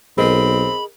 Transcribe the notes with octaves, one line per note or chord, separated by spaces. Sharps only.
B1 C4 G#4 A#4 D#5 B5